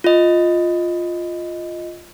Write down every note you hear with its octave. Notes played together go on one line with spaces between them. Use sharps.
F4 D#5